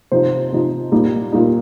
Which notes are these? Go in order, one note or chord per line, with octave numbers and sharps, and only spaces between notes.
C3 F3 D#4 C5
C3 F3 D#4
A#2 G3 D#4
A#2 G3 D#4